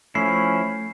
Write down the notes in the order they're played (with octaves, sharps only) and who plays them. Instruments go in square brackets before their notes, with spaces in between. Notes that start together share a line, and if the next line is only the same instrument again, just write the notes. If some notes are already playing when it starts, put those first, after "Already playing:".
[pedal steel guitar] F3 E4 [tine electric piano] A3 [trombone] C#4 [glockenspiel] C7